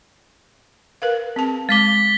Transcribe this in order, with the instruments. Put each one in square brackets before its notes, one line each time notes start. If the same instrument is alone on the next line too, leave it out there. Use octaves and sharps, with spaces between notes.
[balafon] A#4 B4 F5
C4 G#4 A5
[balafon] G#3 D6 [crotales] A6 B6 G7